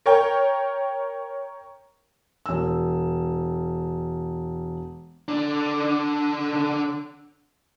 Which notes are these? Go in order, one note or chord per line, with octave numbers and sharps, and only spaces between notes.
A#4 C#5 G5
E1 E6
D3 D4